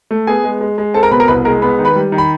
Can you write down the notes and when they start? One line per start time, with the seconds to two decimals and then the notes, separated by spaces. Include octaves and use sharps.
0.11 A3
0.27 B3 G#4 G#5
0.44 G#3
0.61 G#3
0.78 G#3
0.94 C4 A4 A5
1.03 A#4 A#5
1.11 B2 B4 B5
1.20 A#4 A#5
1.28 C2 B4 B5
1.45 G#3 A#4 A#5
1.62 B3 B5
1.79 D#3
1.85 B4 B5
1.96 G3
2.12 D#3
2.18 B5